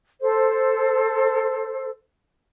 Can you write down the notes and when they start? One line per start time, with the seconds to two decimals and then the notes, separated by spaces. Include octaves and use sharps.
0.22 A4 C5